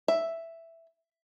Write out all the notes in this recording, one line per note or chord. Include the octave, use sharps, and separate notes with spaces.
E5